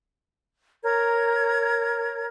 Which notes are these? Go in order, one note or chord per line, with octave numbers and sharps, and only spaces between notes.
A#4 C#5 A#5 G#6